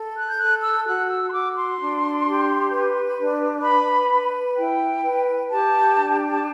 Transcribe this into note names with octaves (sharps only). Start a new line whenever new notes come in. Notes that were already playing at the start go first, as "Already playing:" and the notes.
Already playing: A4
F#6
G6
A4 F#6
E6
F#4 F#6
E6
C6
F#4 D6
C6
D4
G4
B4
D4
B4 B5
B4
E4 G5
B4
G4 A5
D4
A5